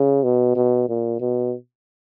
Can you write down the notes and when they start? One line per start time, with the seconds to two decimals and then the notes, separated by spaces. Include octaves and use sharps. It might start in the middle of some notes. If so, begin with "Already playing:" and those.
Already playing: C#3
0.23 B2
0.56 B2
0.89 A#2
1.21 B2